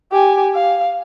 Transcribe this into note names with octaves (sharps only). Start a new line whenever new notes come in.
G4 G#5
F5